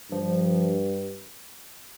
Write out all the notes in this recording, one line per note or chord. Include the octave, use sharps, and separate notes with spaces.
G2 F3